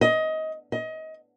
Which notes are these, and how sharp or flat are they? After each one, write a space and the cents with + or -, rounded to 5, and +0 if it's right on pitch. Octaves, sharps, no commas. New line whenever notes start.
D#5 +20
D#5 +25